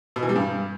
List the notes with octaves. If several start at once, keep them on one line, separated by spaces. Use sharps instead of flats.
B2
E3
G3
G2